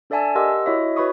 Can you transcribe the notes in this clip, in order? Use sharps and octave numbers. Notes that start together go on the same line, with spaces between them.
D4 A4 D5 E5 G#5 A5
G4 A#4 D#5 F#5 C6 E6
E4 F#4 C#5 D#5 E5
F#4 B4 C#5 B5 C#6 D#6